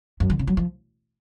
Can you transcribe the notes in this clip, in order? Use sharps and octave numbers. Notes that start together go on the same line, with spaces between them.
F#2
D3
C#3
F#3
F3